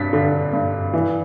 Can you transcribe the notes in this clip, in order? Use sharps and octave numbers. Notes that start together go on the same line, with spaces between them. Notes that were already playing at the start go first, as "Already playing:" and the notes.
Already playing: G2 A6 B6
D3
G2
E3